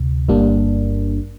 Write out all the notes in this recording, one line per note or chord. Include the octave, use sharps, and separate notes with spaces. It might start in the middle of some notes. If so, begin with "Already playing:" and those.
Already playing: D2 C3
G1 G2 G3 A#3 D4